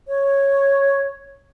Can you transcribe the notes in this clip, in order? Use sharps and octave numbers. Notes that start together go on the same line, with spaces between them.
C#5